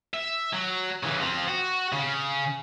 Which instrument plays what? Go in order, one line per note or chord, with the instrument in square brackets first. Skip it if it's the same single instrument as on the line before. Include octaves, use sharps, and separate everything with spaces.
[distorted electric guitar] E5
F#3
C#3 E3
F3 C4
F#4
C#3